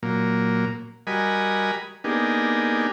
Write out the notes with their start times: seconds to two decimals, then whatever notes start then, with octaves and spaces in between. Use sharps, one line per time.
0.03 A#2 F#3 A#3
1.07 G3 F#4 A#4 D#5 G#5 B5
2.04 A#3 B3 D4 D#4 G4 G#4